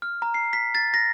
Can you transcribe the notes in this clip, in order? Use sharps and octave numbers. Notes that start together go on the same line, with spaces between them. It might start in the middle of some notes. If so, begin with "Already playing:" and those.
F6
A#5
C7
B6
A6
A#6